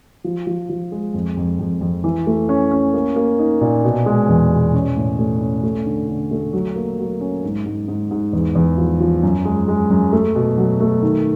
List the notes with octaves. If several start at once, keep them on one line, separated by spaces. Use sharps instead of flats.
F3
F3
F3
G#3
F2
F2
F2
F2
E3
A3
C#4
C#4
A#3
A#3
D#4
A#2
B2
G#3
E2
B2
C#4
A2
A3
C#4
A3
D3
D3
A3
F#3
A#3
F#3
C#4
G#2
G#2
G#2
G#2
E2
E2
F3
F3
F#2
G#3
G#3
F#2
A3
B2
F#3
A3
D#3